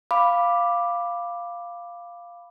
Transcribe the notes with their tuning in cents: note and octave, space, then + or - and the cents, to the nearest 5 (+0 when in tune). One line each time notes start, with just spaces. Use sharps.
F5 +0 B5 +0 D6 +0